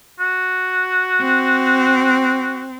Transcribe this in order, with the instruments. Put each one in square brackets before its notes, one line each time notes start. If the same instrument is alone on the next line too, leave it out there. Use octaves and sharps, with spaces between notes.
[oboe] F#4
[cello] C4